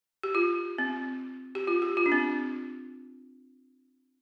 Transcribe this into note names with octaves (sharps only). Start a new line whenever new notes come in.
G4
F4
C4
G4
F4
G4
F4
D4
C4